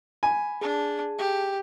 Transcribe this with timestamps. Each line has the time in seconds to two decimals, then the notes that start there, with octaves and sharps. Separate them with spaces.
0.23 G#5 B5
0.61 D4 G#4 A5
1.18 G4